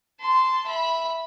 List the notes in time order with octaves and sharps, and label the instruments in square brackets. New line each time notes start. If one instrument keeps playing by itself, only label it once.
[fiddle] A5 C6
E5 B5